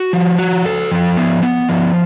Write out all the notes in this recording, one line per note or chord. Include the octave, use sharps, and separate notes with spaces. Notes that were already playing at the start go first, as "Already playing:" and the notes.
Already playing: F#4
F3
F#4
A4
F3
B3
B3
F3